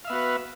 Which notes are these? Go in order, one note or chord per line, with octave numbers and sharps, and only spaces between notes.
B3 F#4 B4 E5 F5